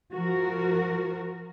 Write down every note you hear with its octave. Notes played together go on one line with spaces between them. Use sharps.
F3 F#4 A#4